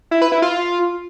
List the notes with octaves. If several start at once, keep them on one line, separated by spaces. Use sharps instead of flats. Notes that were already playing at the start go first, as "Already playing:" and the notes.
E4
B4
E4
F4